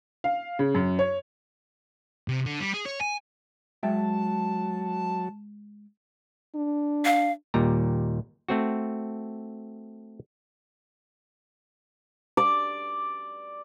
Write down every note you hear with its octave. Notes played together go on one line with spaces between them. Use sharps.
F5
C#3
F#2
C#5
C3
D3
G3
G#4
C#5
G#5
F#3 G#3 E5 G5 A5
D4
F5
D#2 A#2 G3 A#5
A3 C4 F#4
D5